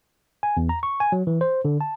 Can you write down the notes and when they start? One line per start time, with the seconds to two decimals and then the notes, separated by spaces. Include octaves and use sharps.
0.43 G#5
0.57 E2
0.69 A#5
0.83 C#6
1.00 G#5
1.12 F#3
1.27 E3
1.41 C5
1.65 D3
1.81 A5